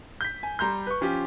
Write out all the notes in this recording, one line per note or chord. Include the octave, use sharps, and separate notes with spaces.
G6 B6
G#5
G3 A#5 C6 G6
B4 C#6
F3 C#4 F4 G4